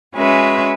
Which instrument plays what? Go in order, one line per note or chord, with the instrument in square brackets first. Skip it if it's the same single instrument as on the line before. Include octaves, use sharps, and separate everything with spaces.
[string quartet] G#3 C#4 F#4 B4 E5